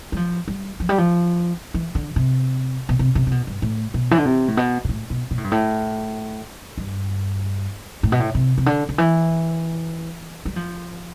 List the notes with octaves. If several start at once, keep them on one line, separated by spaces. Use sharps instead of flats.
G3
F3
G3
F3
G3
F3
E3
D3
C3
B2
C3
C3
C3
B2
G2
A2
B2
E3
D3
C3
A2
B2
B2
A2
B2
B2
A2
G2
A2
G2
A2
B2
A2
C3
C3
D3
D3
E3
G3
F3